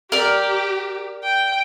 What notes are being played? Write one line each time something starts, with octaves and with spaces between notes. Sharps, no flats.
G4 A#4 D5
G5